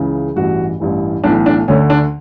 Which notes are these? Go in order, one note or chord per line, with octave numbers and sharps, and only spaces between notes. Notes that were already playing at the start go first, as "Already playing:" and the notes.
Already playing: C#2 C#3 E3
A1 G2 E3 F#4
A1 G2 E3
B1 A2 E3 D4
D4
D2 D3 C#4
D4